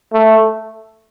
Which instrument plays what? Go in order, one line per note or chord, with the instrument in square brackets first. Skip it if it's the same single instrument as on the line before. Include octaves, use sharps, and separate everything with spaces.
[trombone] A3